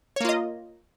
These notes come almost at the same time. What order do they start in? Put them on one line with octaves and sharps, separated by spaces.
C#5 A#3 F4 D#5